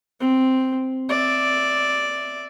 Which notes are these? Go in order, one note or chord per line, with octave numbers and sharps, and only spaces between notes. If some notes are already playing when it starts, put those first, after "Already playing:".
C4
D5 E5